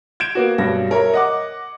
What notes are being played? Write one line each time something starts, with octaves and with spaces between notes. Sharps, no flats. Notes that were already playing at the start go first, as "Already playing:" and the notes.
G6 G#6 D7 E7
A#3 B3 F#4
G2 B2 F#3 A#6
A#4 C#5 E5 A#5
D#5 F#5 D6